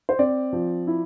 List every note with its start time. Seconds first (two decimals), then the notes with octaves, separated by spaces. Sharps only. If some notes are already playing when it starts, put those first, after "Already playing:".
0.09 C5
0.19 C4 D5
0.53 F3
0.87 E4